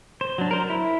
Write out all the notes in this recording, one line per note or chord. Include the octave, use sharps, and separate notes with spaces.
C5
F#3 D4
A#4 C5
E4